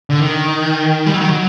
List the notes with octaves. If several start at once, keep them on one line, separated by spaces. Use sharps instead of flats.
D3
D#3
G3
F#3
D#3
F#3